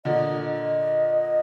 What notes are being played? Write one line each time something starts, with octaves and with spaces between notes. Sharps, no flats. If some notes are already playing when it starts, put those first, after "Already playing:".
A#2 D3 D#5
D#5